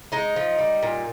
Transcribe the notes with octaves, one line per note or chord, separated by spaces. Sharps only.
G#3 D#4
F3
G3
A#2